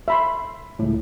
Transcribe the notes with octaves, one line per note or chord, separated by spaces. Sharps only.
E5 B5 C6
C#2 A2